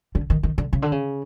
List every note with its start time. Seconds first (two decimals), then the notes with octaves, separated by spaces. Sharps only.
0.15 D3
0.30 D#3
0.43 D#3
0.58 D3
0.73 C#3
0.82 D3
0.92 C#3